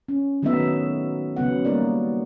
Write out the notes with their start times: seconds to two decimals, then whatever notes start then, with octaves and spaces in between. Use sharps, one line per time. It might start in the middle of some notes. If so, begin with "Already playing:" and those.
0.08 C#4
0.42 D#3 F#3 A3 B3 D#4 E5
1.36 C#3 F#3 B3 F#5
1.65 G3 A#3 D#4 A#4 D5